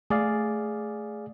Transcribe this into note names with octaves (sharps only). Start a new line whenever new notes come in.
A3 G#4 D5 F5